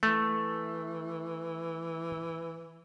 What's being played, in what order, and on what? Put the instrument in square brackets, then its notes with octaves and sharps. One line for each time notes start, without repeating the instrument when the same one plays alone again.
[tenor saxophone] E3 [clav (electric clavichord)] A3